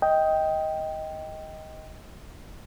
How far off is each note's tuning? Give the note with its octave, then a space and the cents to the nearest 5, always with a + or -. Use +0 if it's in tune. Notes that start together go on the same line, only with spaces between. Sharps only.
D#5 +15 G5 +0